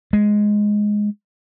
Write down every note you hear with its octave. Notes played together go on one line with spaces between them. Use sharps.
G#3